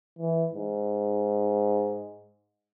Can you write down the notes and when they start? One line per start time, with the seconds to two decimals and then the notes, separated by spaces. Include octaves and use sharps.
0.18 E3
0.53 G#2